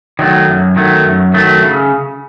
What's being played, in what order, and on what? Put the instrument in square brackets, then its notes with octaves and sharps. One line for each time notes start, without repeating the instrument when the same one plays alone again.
[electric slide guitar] D#3 F#3 A3
F#2
D#3 F#3 A3
F#2
D#3 F#3 A3
C#3